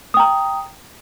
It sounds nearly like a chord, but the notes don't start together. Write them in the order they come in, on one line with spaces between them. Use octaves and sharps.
D#6 G5 A#5